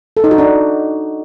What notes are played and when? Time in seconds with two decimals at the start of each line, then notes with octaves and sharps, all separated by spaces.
0.17 A4
0.24 D#4
0.31 F#4
0.38 D4